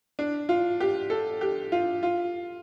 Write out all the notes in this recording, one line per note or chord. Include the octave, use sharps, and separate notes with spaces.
D4
F4
G4
A4
G4
F4
F4